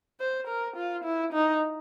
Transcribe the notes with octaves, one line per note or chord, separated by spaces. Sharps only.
C5
A#4
F4
E4
D#4